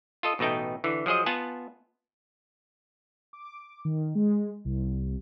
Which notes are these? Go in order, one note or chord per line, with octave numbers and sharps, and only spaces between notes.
F4 A4 D#5
A1 B2 A3 D#4 G5
D3 E3
F3 F#3 G#4 C5 D#5
B3 F4 F#5 G#5 A5
D6
D#3
G#3
C2